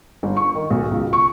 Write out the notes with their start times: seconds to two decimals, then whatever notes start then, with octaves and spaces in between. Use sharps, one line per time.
0.23 G1
0.37 C#6
0.55 D#3
0.70 B1
0.91 C#2
1.13 C#6